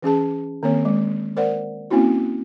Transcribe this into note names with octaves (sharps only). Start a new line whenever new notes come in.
E3 C#4 G#4 A5
D#3 A#3 C4 C#5
G#3
A#4 C5 D5 F#5
A#3 C4 C#4 E4 F#4